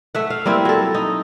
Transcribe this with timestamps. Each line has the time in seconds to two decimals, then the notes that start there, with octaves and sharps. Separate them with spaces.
0.15 A3 E5 F#5
0.30 F5
0.45 G3 A#3 C4 E4
0.65 F#3 A4
0.94 D#4